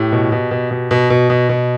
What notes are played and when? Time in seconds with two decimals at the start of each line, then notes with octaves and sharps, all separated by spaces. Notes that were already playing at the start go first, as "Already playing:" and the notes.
Already playing: A2 G4
0.12 B2
0.32 B2
0.51 B2
0.71 B2
0.91 B2
1.10 B2
1.30 B2
1.49 B2